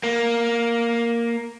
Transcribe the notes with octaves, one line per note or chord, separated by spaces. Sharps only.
A#3